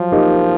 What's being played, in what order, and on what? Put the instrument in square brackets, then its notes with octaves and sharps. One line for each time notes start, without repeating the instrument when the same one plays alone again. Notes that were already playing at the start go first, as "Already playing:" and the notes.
Already playing: [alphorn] F3 [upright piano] F#3
[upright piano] A#3 D#4 G4